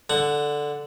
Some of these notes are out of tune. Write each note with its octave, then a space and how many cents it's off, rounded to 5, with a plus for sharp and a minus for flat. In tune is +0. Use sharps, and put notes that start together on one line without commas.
D3 +0 F#5 +10